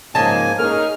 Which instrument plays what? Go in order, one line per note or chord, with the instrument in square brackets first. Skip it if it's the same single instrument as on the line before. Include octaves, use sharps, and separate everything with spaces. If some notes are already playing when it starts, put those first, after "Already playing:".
[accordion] G#2 A#3 G#5 [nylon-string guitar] C#3 F3 G#4 [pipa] D#5 A5
[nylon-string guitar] A#3 A#4 [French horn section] C#4 D#4 G#4 [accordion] F6